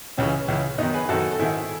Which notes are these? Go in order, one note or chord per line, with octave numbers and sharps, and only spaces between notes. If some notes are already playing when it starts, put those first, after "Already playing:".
C#2 C#3 E3 C#4
C#2 C#3 E3
F#2 D#3 B3 D#4
G#4 B4
F#2 D#3 F#4 A4
A4
G#2 D#3 E4 G#4